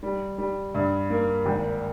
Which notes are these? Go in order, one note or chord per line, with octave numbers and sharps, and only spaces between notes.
G3
G3
G2
A#3
G#1